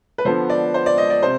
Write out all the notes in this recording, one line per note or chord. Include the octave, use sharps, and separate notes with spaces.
B4
D3 F3 B3 C5
D5
C5
D5
D#5
D5
C3 C5